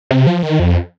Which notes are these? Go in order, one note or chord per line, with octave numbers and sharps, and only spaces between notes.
C3
F3
D#3
F2